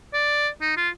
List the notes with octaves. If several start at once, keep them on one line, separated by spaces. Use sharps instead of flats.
D5
D#4
F4